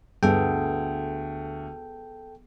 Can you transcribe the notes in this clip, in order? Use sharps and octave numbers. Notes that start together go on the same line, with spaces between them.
D2 G2 B3 G#4 A4 G5